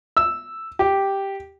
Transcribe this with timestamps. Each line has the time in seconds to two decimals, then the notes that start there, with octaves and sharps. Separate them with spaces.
0.17 E6
0.79 G4